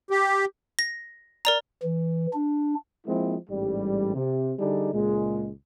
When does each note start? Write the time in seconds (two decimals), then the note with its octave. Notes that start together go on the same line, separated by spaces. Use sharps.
0.10 G4
0.79 A#6
1.45 A#4 D5 A#5
1.83 E3
2.33 D4
3.06 F3 G#3 A#3 C4 E4
3.49 A1 G#2 G3
4.15 C3
4.59 D3 G3 D4 D#4 G#4
4.94 C#2 A#2 G#3